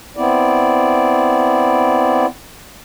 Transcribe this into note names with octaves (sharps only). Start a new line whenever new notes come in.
B3 C4 E4 D5